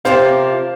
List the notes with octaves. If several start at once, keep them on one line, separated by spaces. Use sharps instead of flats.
C3 F3 A#3 F4 C5 F5